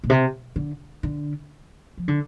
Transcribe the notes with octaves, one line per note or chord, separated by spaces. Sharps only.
A#2
C3
D3
D3
F3
D3